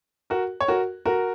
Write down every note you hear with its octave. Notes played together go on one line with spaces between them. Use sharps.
F#4 A#4
C#5
F#4 A#4
F#4 A#4